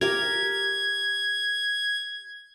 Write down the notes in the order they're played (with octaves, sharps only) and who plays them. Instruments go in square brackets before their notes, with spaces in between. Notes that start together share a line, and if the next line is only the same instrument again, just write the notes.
[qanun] G4 A#4 [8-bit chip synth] G#6